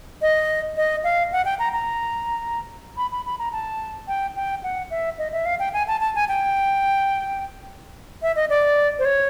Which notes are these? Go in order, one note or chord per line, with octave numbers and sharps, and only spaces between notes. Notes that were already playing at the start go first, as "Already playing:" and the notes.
D#5
D#5
F5
F#5
G5
A#5
A#5
B5
B5
B5
A#5
A5
G5
G5
F#5
E5
D#5
E5
F5
G5
G#5
A5
A5
G#5
G5
E5
D#5
D5
C5
C#5